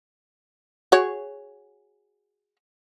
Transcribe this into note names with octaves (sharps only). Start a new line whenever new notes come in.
F#4 G#4 C#5